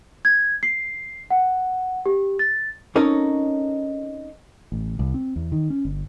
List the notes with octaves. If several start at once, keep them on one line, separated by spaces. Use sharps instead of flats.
G#6
C7
F#5
G4
A6
C4 C#4 D#4 A4 A#4 C#5
A1
C2
C4
E2
D#3
C#4
G1